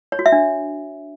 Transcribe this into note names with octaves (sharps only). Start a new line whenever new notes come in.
C#5
F#4
E5
D4